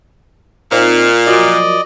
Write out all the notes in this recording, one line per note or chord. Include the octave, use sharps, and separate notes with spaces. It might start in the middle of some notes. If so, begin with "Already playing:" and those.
A#2 C4 D#4 F4
F3 F#3 A#3 D5 D#5